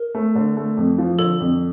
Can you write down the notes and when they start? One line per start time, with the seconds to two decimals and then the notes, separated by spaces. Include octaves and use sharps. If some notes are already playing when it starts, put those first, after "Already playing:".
Already playing: A#4
0.15 A3
0.35 D3
0.57 A3
0.77 F2
0.98 F3
1.19 D3 A4
1.40 F2